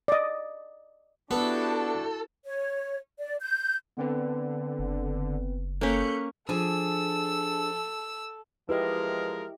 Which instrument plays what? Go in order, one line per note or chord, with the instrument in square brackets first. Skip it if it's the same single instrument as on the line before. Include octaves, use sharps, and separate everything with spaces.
[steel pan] D5 D#5
[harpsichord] B3 [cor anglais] D4 [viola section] E4 F#4 G4 [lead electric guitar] A4
[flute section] C#5
D5
G6
[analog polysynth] D3 [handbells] B3 C4 B4
[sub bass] F#1
[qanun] A#3 C#4 [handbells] A4 B6 [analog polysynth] F#6 G6 C#7
[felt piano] F3 [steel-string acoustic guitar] D4 G#4 G#5 [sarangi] A4 [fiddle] E6
[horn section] F3 G#3 A#4 [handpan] E4 G4 D#5 [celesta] B4